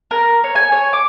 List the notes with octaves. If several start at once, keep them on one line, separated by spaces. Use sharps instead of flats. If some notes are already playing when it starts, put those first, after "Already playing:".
A#4
C#5
G#5
C#5
D6